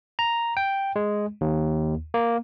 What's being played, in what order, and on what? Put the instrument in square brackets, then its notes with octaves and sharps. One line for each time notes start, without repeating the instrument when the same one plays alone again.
[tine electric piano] A#5
G5
G#3
D#2
A#3